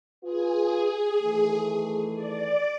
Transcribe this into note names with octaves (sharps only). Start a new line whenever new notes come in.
F4 G#4 B4
D#3 E3 A3
D5